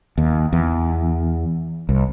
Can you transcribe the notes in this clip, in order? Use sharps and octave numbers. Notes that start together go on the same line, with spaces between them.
D#2
E2
C2